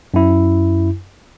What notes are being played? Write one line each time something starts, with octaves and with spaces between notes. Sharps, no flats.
F#2 E4